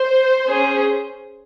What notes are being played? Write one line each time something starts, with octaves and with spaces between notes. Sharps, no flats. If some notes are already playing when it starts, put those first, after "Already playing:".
Already playing: C5
C#4 G#4